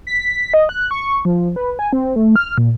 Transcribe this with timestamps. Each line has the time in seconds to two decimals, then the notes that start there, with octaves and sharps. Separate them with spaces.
0.07 B6
0.54 D#5
0.69 F#6
0.91 C#6
1.25 F3
1.56 B4
1.79 G#5
1.93 C4
2.16 A3
2.36 F6
2.58 A#2